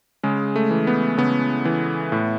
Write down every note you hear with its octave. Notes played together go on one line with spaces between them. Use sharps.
C#3 G#3
A3
E3
B3
C#3 B3
E3
A2